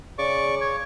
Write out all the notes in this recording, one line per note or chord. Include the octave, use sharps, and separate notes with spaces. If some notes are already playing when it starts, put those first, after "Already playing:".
C#3 D5 C#6 D6
C#5